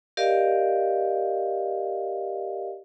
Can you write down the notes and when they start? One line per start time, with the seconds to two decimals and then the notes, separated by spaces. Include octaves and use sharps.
0.17 G4 A#4 D5 D#5 F5